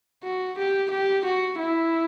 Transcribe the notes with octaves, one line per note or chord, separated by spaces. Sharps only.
F#4
G4
G4
F#4
E4